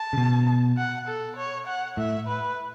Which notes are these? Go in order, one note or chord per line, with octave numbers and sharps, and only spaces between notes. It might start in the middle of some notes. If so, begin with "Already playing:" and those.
Already playing: A5
C#3
B2
F#5
A4
C#5
F#5
A2 E5
B4